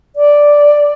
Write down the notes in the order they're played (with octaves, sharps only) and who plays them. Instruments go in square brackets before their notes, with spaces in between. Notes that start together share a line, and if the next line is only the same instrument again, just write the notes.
[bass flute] D5